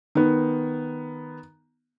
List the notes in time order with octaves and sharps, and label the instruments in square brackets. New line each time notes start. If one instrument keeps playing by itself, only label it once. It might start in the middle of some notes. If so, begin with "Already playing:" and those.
[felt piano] D#3 B3